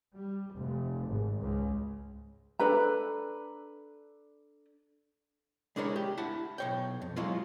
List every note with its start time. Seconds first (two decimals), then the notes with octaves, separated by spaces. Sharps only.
0.16 G3
0.55 F1
1.09 G#1
1.40 C#2
2.59 D4 A4 B4 A#5
5.76 G#3 D4 E4 A#4 C#5
5.96 G4
6.18 E4 F#5 A5
6.58 B1 C#5 G5
7.02 F2
7.17 F#3 G#3 E4 F4